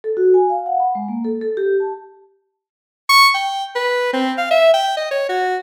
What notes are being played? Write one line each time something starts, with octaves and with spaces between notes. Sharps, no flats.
A4
F#4
G#5
F5
F#5
B5
G#3
A#3
A4
A4
G4
A5
C#6
G5
B4
C4
F5
E5
G5
D#5
C#5
F#4